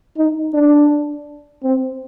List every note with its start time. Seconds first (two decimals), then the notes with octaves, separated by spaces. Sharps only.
0.17 D#4
0.54 D4
1.64 C4